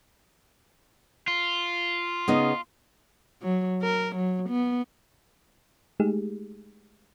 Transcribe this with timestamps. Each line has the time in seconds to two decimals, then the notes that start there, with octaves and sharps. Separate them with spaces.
1.28 F4
2.28 C#3 B3 D#4
3.42 F#3
3.82 A#4
4.16 F#3
4.49 B3
6.00 G#3 A3 D#4 G4 G#4